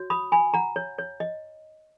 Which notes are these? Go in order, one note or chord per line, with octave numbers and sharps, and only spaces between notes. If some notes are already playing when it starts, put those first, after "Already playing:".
Already playing: F#4 C#5
B5 D#6
G#5 B5
F#5 A#5
C#5
C#5
D#5